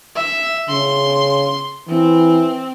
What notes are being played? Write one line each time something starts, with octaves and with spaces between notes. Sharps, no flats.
E5
C#3 C6
E3 C4